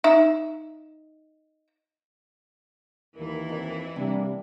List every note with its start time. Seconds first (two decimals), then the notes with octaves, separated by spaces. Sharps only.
0.04 D#4 E5
3.16 D#2 E3 E4 A#4
3.49 F2
3.96 C3 G3 A#3 D4